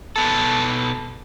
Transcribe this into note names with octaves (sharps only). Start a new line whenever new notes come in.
B2 A4